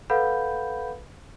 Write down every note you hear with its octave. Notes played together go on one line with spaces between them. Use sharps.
A4 B4 F5 F#5 B5 G6